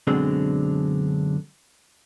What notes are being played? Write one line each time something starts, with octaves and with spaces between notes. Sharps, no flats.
F#2 B2 D3 G#3 C4 D4